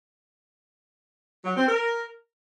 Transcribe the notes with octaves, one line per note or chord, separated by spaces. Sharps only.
F#3
C4
A#4